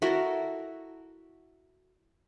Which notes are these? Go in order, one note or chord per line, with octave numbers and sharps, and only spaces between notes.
E4 F#4 A4 A#4